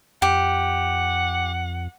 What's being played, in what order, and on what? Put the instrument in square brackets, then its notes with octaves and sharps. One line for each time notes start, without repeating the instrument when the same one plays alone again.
[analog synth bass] F2 [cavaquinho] G4 [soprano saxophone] F#5